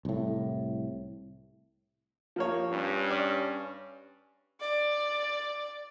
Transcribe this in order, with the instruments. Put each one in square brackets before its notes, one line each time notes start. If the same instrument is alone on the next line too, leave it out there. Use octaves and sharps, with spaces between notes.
[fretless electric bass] C2 A2
[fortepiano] F3 A#3 C#5
[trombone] G2 [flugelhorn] C#4
[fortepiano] D5 D6
[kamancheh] D5